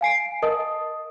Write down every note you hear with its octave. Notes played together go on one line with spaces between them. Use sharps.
F5 G#5 C7 D7
A#4 D#5 A5 D#6